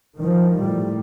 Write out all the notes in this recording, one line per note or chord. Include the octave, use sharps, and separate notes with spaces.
D#3 F3
A2 G3